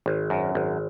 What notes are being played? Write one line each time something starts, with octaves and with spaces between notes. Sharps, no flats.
G#1
F#2
G#1